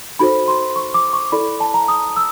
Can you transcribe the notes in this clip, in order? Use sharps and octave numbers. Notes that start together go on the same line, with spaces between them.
D#4 F#4 A4 C5 B5
C6
C#6
D6
C#6
E4 A4 D5 B5
A5
A#5
D#6
E6